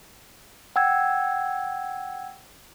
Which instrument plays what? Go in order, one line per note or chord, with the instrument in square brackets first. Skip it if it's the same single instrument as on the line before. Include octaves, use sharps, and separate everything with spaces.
[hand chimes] F#5 G5 E6 G#6